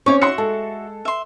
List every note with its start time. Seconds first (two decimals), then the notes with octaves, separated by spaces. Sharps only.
0.06 C4 C#4 C#5 C#6 D6
0.21 F#4 E5 C6 F#6 C#7
0.38 G#3 A4
1.05 E5 C6